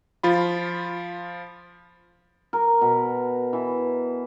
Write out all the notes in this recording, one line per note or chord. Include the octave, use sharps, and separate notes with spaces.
F3 F4 B5
A#4
B2
E3